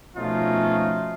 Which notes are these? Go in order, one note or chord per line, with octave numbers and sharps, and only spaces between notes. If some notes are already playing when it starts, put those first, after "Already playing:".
B2 F3 A3 C#4 D#4 F4